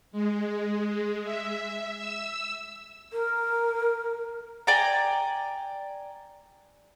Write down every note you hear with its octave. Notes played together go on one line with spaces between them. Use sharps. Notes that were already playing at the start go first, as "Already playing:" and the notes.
G#3
E5
E6
A#4
D5 G5 G#5 A#5